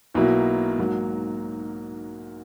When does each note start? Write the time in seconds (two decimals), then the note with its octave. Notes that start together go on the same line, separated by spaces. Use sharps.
0.14 B1 B2 F#3 A#3 E4
0.78 G#2 F#3 A#3